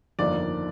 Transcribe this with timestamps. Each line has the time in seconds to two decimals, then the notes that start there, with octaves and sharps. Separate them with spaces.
0.19 G1 F2 D#3 A#3 D#4 D5